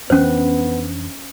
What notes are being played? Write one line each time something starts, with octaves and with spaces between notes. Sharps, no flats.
F2 E3 B3 C#4 D4 C5